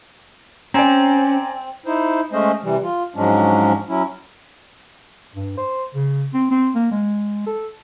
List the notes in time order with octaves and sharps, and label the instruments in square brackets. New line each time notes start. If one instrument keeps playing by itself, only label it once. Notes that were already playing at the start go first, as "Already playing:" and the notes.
[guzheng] C4 [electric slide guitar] C#4 [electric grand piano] D5 G#5 A#5
[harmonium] D#4 E4 C5
G#3 A3 C#4 C5 D#5
C3 E3 G3
F4
G#2 F3 F#3 G#3 C#4 D4
F#3 C#4 E4
[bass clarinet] G2
C5
C#3
C4
C4
A#3
G#3
A4